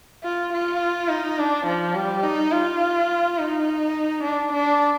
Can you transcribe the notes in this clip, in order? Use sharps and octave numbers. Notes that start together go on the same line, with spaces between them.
F4
F4
D#4
D4
F3
G3
D#4
F4
D#4
D4
D4